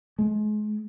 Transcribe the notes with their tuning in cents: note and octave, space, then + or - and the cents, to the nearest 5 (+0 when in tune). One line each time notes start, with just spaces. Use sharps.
G#3 +35